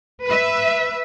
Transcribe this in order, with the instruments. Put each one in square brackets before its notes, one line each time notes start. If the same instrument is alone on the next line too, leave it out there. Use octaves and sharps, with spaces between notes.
[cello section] B4 E5